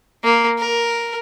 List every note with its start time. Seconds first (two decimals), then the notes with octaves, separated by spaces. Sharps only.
0.24 A#3
0.59 A#4